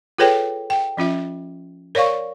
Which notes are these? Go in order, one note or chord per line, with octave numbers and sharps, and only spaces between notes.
F4 G#4 A4 B4 C#5 G5
G5
F3 C#4 F4 E5
A#4 C#5 D5 F5 C#6